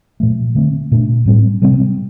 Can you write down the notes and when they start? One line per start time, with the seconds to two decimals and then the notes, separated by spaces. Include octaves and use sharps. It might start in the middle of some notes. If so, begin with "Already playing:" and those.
0.20 A#2 F3 A3
0.55 D3 A3 C4
0.91 A#2 A3 D4
1.26 A2 G3 C4
1.62 C3 G3 C4